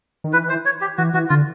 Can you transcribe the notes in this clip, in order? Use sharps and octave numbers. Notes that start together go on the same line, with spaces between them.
D#3
E3 B4
C5
C#5
G4
E3 F#4
E3 F#4
D3 F4